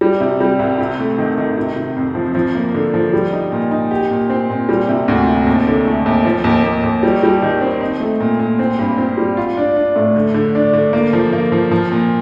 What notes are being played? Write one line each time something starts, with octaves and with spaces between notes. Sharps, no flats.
G3
C3
G3
C2
C3
A3
D#3
D#3
C3
C3
F2
F3
F3
A#3
D3
F3
G3
D#4
A#2
D#4
G4
A#2
C4
A#2
G3
C3
D2
C3
D#2
D3
A3
D#2
F3
D#2
D#2
D#2
G3
G3
D#3
C4
D#4
A3
A#2
A#2
C4
G2
C4
G3
F4
D4
D4
A2
D3
D3
D4
D3
A#3
F3
A#3
F3
F3
A#2